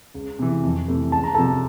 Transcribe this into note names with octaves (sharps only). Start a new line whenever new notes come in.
C#2
C3 E3
F2
C3 E3 A3
C#2 A5
A#5
C3 F3 A4 A5